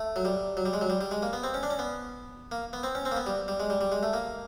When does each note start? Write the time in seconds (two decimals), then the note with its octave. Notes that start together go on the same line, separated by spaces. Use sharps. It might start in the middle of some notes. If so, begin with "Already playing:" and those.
Already playing: A3
0.16 F#3
0.25 G3
0.57 F#3
0.66 G3
0.73 G#3
0.81 F#3
0.90 G3
1.01 G3
1.11 G#3
1.22 A#3
1.33 B3
1.43 C4
1.54 C#4
1.63 D4
1.70 C#4
1.79 B3
2.52 A#3
2.73 B3
2.83 C4
2.95 C#4
3.05 C4
3.12 A#3
3.16 B3
3.26 G3
3.48 G3
3.60 G#3
3.70 G3
3.81 G3
3.92 G#3
4.03 A3
4.13 A#3